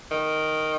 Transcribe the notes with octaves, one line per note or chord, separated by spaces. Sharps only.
D#3